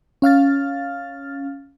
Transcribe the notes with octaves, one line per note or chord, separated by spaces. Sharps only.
C#4 F5 F6 A6